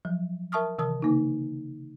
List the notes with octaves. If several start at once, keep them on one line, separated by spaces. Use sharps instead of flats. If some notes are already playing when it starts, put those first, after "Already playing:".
F3 F#3
A#4 E5 A5 C#6 D#6 F6
C3 D#3 E3 A#4 A5 D#6
C#3 A#3 D#4